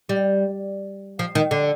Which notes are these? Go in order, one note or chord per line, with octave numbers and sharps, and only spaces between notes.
G3
F3
D#3
D3